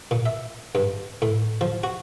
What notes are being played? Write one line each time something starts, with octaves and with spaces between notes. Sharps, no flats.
A#2
E5
G2
A2
F3
F#4